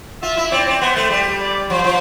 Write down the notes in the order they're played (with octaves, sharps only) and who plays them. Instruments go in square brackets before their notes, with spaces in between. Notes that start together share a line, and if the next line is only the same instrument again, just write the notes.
[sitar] F4 [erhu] E5
[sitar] E4
[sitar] C4 [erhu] D5
[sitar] C4
[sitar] B3 [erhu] C5
[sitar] A3
G3
[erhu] D5
[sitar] F3 [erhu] C5
[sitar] F3